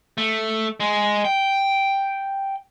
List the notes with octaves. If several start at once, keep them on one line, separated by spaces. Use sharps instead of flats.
A3
G#3
G5